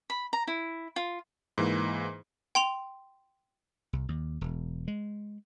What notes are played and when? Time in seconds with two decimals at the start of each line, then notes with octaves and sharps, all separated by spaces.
0.10 B5
0.33 A#5
0.47 E4
0.96 F4
1.58 G#2 E3 A#3
2.55 G5 C6 F7
3.93 C2
4.09 D#2
4.41 E1
4.88 G#3